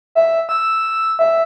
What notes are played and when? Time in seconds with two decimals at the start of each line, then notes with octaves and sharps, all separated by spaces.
0.15 E5
0.49 E6
1.19 E5